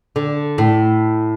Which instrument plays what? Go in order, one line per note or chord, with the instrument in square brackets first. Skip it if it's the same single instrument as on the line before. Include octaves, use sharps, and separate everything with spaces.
[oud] D3
A2